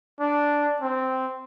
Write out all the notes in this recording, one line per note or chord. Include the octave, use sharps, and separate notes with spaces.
D4
C4